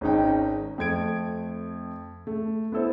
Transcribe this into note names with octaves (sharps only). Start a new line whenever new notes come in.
G#1 G#3 C#4 D#4 G5
F2 A3 G#6 D7
A3
B3 E4 A4 C5